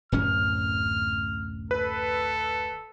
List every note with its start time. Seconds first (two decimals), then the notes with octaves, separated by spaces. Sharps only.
0.12 D1 F#2 C#4 F6
1.71 A4 B4